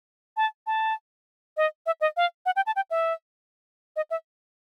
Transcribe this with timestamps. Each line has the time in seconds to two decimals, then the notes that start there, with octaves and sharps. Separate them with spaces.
0.37 A5
0.67 A5
1.57 D#5
1.86 E5
2.01 D#5
2.17 F5
2.46 F#5
2.56 G5
2.66 A5
2.76 G5
2.91 E5
3.96 D#5
4.11 E5